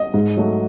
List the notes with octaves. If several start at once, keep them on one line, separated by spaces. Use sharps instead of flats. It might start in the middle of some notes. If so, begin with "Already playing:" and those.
Already playing: D#5
G#2
F#3 A3